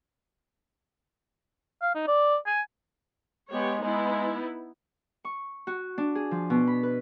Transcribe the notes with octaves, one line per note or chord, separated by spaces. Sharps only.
F5
D#4
D5
G#5
G#3 B3 G4 C#5
G#3 B3 D#4 E4
C#6
F#4
D4
G#4
F3
B2
B5
B4